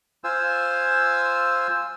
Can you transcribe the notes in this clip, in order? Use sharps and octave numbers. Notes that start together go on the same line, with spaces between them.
F4 C5 G#5 E6